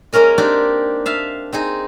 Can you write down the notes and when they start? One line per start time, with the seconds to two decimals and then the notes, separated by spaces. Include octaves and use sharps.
0.13 G#3 A#3 C#4 A#4 D#5
0.38 C4 D4 D#4 G4 D5
1.06 E5 F5 A5
1.53 C4 D#4 G#4